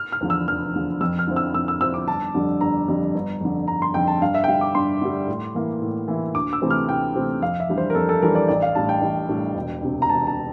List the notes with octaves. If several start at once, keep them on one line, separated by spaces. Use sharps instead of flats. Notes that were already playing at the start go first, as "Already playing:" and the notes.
Already playing: F6
F6
E2 D3 F3
E6
F1 F6
E2 D3 F3
F2 E6
F6
D3 F3 C4 E4
E6
F2 E6
E6
D3 F3 C4 E4 E6
D6
G1 A5
F2 D3 G3 D4
G1 A#5
F2 D3 G3 D4
G1
F2 D3
G1 A#5
C6
F2 D3 G5
A5
G2 F5
E5
G5
D3 G3 F5
D6
G2 C6
D3 G3
A2
E3 A#3 E4
A2
E3 A#3 E4
D2 D6
E6
C3 E3 A3 C4
F6
D2 G5
C3 E3 A3 C4
F2 F5
E5
E3 G3 D4
C5
A#4
F2 A4
A4
E3 G3 D4 A#4
D5
A1 D5
F5
A2 G3 D4 A5
G5
A1
A2 G3 D4
E1
D2 C3
A#5
E1 A5
A5